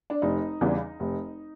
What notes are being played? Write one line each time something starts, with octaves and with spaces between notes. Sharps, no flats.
D4
F1 D#4
E2 C#3 E3 G3
F1